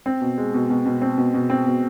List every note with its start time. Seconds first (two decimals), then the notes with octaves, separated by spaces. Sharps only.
0.06 C4
0.21 B2
0.38 G#3
0.54 B2
0.70 B2
0.86 B2
1.02 C4
1.18 B2
1.34 B2
1.50 C4
1.66 B2